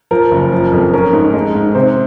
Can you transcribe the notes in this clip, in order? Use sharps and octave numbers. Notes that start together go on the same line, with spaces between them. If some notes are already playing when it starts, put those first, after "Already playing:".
F3 A#4
F#1
F3
F2
C#4 A#4
G#2
G#3
G#2
C3 C5